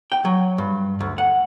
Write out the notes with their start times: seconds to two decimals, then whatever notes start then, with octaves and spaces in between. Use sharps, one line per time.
0.12 G5
0.25 F#3
0.58 G2
1.00 D2
1.18 F#5